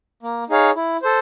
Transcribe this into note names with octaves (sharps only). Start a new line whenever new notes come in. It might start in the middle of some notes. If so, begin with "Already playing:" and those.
A#3
D#4 G#4 C#5 F5
E4
A4 C5